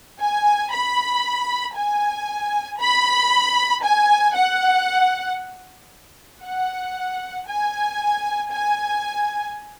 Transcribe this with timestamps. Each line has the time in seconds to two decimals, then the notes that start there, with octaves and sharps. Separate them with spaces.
0.19 G#5
0.71 B5
1.76 G#5
2.79 B5
3.83 G#5
4.35 F#5
6.43 F#5
7.47 G#5
8.50 G#5